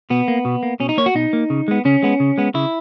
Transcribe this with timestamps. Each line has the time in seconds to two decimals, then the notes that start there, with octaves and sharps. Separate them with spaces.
0.10 B2 B3
0.28 A#3
0.45 B2
0.63 A#3
0.80 B2 C#4
0.89 D#4
0.97 A#3 C#5
1.06 F#4
1.15 B2 D#4
1.33 A#3
1.50 C#3
1.68 G#3 B3
1.85 C#3 C#4
2.03 G#3 B3
2.20 C#3
2.38 G#3 B3
2.54 C#3 E4